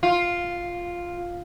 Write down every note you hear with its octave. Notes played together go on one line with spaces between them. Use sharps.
F4